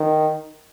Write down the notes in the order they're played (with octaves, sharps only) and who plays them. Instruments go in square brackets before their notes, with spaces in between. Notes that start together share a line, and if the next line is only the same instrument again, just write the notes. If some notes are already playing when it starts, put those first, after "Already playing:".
Already playing: [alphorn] D#3